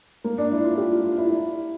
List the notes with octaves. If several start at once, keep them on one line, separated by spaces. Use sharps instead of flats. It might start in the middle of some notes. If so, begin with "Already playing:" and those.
A#3
D4
E4
F4
G4
F4
F4
E4